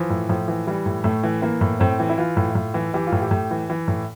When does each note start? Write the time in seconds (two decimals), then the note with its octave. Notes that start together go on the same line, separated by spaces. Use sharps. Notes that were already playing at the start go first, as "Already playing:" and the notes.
Already playing: E3 F3
0.10 A2
0.29 A2 F3
0.48 E3
0.67 E3 G3
0.86 A2
1.04 A2 A3
1.23 E3
1.42 E3 A#3
1.61 A2
1.80 A2 C4
2.00 E3
2.10 E4
2.18 E3 F4
2.37 A2
2.55 A2
2.74 E3
2.94 E3 G4
3.07 F4
3.12 A2
3.21 G4
3.31 A2
3.51 E3
3.70 E3
3.88 A2